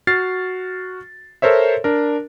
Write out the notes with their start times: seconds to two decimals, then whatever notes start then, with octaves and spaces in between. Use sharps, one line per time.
0.07 F#4 F6 A6 C7
1.42 A4 A#4 C5 C#5 E5
1.84 D4 A#4